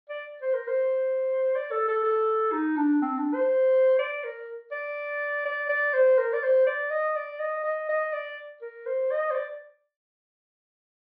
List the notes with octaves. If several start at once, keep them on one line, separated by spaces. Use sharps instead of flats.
D5
C5
A#4
C5
D5
A4
A4
A4
D#4
D4
C4
D4
C5
D5
A#4
D5
D5
D5
C5
A#4
D5
C5
D5
D#5
D5
D#5
D#5
D#5
D5
A#4
C5
D#5
C5
D5